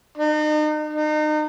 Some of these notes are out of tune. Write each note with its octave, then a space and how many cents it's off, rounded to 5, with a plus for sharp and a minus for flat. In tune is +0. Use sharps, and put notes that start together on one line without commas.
D#4 -40
D#4 -35